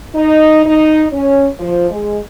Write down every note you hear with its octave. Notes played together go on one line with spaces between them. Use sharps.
D#4
D#4
C#4
F3
G#3